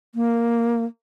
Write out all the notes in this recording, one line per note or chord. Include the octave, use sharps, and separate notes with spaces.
A#3